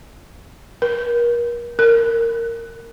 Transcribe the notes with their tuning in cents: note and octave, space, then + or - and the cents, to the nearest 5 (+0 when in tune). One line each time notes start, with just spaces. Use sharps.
A#4 +35
A#4 -15